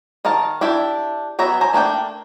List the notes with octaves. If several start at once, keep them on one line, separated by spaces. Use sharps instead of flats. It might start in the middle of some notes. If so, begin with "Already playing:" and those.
D#3 A#4 F5 A5
D4 E4 G4 E5
F#3 B3 C#5 E5 A#5
C5 G#5 A#5
A3 A#3 D4 G5